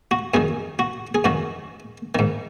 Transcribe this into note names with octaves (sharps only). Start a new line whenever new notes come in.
F#4
F#2 D#3 G#4
F#4
G#4
F#2 D#3 F#4
G#2 D#3